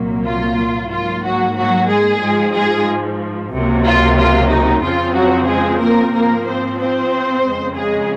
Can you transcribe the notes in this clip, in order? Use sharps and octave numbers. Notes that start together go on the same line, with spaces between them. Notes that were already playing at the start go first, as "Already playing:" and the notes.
Already playing: C2 A#2 F#3 A#3
F4
G#2 F#3 A#3 F4
F#3 F#4
F#3 F#4
G#3 G#4
G#2 F3 G#3
G#3 G#4
C#2 C3 F#3 A#3
F4
F4
D#4
F2 C#3 F3 C4 F4
F#3 F#4
G#3 G#4
A#3 A#4
G#2 F3 A#3 C4 A#4
C4 C5
C4 C5
F2 C#3 G#3
G#3 G#4